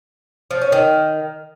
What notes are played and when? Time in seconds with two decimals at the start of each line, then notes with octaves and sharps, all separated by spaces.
0.51 F3
0.61 C#4
0.72 D#3